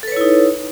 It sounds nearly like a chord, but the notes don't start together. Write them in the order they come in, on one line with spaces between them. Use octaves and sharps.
A4 B4 C#5 E4 D#4